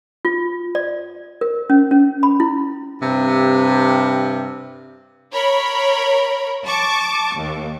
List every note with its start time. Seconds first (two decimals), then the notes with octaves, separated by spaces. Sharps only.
0.25 F4
0.75 D5
1.41 A#4
1.70 C#4
1.91 C#4
2.23 B5
2.40 E4
3.02 G2 C3
5.31 A#4 C#5 B5
6.65 A5 C#6 D6
7.36 D#2